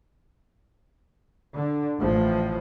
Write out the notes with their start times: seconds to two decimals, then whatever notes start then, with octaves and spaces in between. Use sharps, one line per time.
1.55 D3
1.99 A1 A2 F3